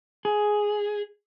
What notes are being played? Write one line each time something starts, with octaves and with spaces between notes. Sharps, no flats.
G#4